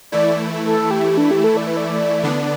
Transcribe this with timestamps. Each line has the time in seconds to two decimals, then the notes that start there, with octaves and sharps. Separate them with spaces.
0.12 E3 A3 E4 D5
0.65 A4
0.91 G4
1.18 D4
1.31 G4
1.44 A4
1.57 D5
1.67 B4
1.77 D5
2.23 D3 B3 D4